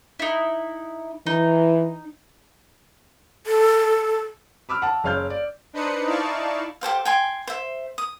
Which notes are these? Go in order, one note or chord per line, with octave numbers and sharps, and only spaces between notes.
D#4 E4
E3 D#4
A4
B5 D6 E6 F6
F#5 A5
F#1 C#5 F5 F6 G6
D5
D4 D#4 B4 C5 D#6 C#7
D#4 E4 D5 F5 A5 C#6
G4 A4 C5 F5
G5 G#5 C6
C5 E5
D#6